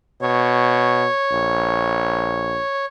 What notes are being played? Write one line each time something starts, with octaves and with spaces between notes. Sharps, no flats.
B2 C#5
A#1